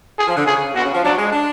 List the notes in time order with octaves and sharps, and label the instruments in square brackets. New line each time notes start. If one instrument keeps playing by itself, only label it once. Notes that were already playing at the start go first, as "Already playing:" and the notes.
[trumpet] G#4
[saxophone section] F3
D3
[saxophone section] C#3 [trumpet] G#4
[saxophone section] B2 [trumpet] F#4
[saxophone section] C#3
F3
[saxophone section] F#3 [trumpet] D4
[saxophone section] G#3
D4